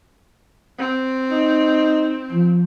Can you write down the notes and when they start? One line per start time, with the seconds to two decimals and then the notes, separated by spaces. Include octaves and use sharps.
0.79 C4
1.30 D#4
2.32 F3